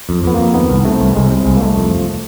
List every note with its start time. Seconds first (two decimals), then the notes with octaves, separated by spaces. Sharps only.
0.09 F2
0.24 F2 B3
0.34 F2 A#3
0.54 D#3 B3
0.70 C2
0.84 C3 A3
1.00 C2
1.15 C2 G#3
1.31 C3 G#3
1.45 C2 G#3
1.56 A#3
1.61 C2 A3
1.76 F2
1.91 F3